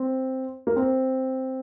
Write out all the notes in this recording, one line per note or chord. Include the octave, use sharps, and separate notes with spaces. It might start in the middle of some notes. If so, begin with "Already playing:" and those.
Already playing: C4
A#3
C4